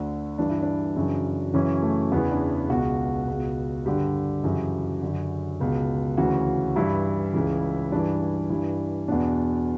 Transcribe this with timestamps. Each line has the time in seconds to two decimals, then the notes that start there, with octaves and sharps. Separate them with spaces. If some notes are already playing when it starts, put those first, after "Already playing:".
Already playing: D2 D3
0.38 G2 E3 D4
0.49 E4
0.62 D4
0.96 F#2 C#3 E3
1.54 F#2 C#3 E3 C#4
1.82 A3
2.12 E2 C#3 E3 B3
2.31 D4
2.69 C#2 B2 F#4
3.27 C#2 B2
3.85 G2 D3 G4
4.44 F#2 C#3 E3
5.02 F#2 D3
5.61 C#2 B2
6.17 D2 C#3 E3 F#4
6.76 G2 E3 E4
7.33 C#2 C#3 E3
7.92 G2 E3 D4
8.50 G2 E3
9.08 E2 B2 D4